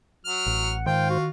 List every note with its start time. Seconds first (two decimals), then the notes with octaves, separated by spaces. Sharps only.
0.25 F#3 F6
0.46 A1
0.64 F#5
0.86 G#2 D#3 F4 C5 G5
1.10 F#4